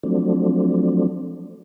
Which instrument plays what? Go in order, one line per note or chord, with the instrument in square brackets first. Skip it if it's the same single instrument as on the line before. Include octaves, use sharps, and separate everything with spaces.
[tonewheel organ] F3 F#3 A3 C4 D4